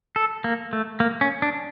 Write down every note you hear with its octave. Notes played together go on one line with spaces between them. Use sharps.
A4
A#3
A3
A#3
C#4
D4